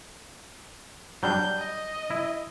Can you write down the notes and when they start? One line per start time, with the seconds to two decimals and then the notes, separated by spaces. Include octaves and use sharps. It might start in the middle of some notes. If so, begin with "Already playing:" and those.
1.23 F#3 G3 D4 G6
1.58 D#5
2.10 E4